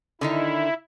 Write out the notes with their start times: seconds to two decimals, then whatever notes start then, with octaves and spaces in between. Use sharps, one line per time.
0.21 D3 D#3 D#4 E4